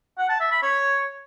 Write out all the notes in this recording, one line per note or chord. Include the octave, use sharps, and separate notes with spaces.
F#5
A5
E5
B5
C#5